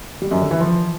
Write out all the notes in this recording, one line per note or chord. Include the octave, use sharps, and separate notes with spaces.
G3
F#2
D3
E3
F3